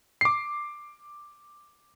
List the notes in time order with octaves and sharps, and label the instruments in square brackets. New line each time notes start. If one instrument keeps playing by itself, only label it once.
[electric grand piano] D6 C7